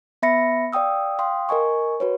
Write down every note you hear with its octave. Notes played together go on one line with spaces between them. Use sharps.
B3 E5 B5 A#6 C#7
D5 F5 G5 D#6 E6
F5 G5 C6 D#6
A#4 D#5 G#5 C#6
F#4 B4 C#5